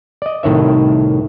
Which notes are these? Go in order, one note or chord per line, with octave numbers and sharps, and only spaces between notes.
D5 D#5
C2 A2 D#3 C#5 E5